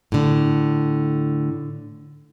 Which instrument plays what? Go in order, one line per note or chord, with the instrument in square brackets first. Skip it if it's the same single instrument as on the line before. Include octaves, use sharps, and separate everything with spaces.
[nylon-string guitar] A2 D3